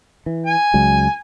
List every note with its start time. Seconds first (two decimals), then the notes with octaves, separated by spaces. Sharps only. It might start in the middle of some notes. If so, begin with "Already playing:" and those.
0.26 E3
0.46 G#5
0.74 C#2 F#3 G#3